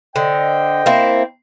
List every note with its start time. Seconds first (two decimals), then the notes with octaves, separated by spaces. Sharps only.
0.16 D3 C5 D#5 G5
0.86 A#3 C4 E4